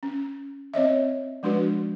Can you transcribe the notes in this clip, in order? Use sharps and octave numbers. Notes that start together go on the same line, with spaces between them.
C#4
C4 C#5 D#5 E5
F3 G#3 D4 F#4 B4